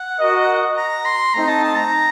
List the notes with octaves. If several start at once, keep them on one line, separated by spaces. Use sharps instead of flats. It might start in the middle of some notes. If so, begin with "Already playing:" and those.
Already playing: F#5
F#4 A#4 D#5
A#5
C6
A3 C4 D#4 A#5
A5
A5
A#5